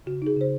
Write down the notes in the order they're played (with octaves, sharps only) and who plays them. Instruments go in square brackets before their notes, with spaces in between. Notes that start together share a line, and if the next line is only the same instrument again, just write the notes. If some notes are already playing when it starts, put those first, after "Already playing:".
[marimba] C#3 F#4
D#4 G#4
C#3 C5